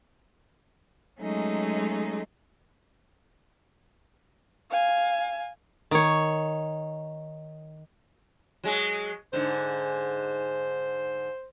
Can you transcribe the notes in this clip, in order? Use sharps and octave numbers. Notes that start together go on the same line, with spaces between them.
F#3 G#3 A3 C#4 D#4
F5 G#5
D#3 C#5
F#3 G#3 G#4
G#2 D3 C5